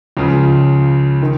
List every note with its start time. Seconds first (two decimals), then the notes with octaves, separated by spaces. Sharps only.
0.17 C#2 C#3 F3
1.22 D#3